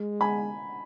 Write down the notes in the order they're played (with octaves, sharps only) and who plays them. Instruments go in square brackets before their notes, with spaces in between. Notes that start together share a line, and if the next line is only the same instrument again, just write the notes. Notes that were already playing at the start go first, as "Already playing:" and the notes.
Already playing: [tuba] G#3
[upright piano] G#5 B5